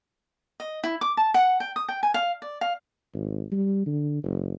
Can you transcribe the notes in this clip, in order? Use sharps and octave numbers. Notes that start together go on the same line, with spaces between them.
D#5
E4
D6
A5
F#5
G5
D#6
G5
G#5
F5
D5
F5
G#1
G3
D3
F#1